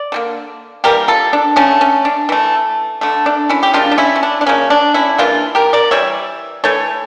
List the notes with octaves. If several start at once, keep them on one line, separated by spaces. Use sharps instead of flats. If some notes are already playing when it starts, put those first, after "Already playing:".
Already playing: D5
D3 G3 A#3
E3 G3 A#3 G4 A#4
F4 A4
D4
D3 A3 C#4
C#4
D4
E3 A3
D3 A3
D4
C#4 E4
G4
C#3 G3 A#3 D4 F4
D4
C#4 E4
C#4
D4
D4
C#3 F3 A#3 C#4
D4
C#4 E4
C#3 E3 A#3 D4 F4
G4 A#4
A#4 D5
E3 G3 C#5 E5
E3 A3 A4 C#5